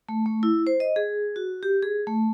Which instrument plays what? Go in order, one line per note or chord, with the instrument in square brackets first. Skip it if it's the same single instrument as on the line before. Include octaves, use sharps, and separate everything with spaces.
[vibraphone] A3
A3
E4
C5
D#5
G#4
F#4
G4
G#4
A3